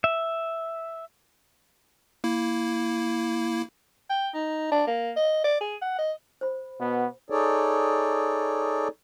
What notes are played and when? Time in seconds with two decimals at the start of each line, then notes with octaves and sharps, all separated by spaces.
0.04 E5
2.24 A#3 E4
4.10 G5
4.34 D#4
4.72 D4
4.87 A#3
5.17 D#5
5.44 D5
5.61 G#4
5.82 F#5
5.98 D#5
6.41 C5 B5
6.80 B2 B3
7.30 D#4 G#4 A4 C#5 D5